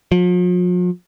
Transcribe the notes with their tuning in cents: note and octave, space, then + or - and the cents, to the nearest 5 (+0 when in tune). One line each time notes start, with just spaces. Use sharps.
F3 +45